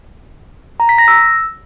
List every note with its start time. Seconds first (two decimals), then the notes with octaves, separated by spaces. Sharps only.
0.80 A#5
0.89 B6
0.98 A#6
1.08 E6